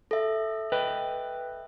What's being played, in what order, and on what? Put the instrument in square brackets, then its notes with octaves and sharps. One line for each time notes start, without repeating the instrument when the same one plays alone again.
[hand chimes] A4 E5
[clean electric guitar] B4 D#5 G5